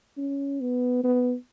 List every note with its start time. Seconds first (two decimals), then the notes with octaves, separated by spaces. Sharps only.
0.18 C#4
0.61 B3
1.04 B3